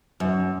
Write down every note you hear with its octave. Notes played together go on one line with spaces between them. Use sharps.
F#2